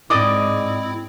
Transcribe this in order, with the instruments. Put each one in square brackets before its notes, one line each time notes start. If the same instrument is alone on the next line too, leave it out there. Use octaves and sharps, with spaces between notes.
[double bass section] G#2 [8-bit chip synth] C4 E4 [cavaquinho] D5 D#5 D6